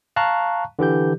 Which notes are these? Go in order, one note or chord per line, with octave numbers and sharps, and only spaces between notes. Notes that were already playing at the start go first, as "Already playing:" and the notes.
F5 A5 A#5 C#6 F#6
D3 E3 G4 G6